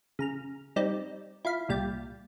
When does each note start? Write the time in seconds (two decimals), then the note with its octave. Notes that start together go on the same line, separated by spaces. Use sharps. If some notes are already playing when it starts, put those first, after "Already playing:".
0.19 C#3 A#5 F6
0.76 G3 C4 D#4 D5
1.45 E4 F4 F5 B5
1.69 C2 A#2 G3 G5 A6